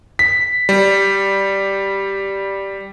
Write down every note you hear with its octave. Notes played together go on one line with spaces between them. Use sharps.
B6
G3